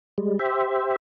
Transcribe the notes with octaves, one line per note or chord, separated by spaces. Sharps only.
G3 G#3
G4 C5 E5